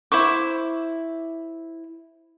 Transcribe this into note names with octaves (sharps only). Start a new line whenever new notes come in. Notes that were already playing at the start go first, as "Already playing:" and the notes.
E4 C5 C#6 D6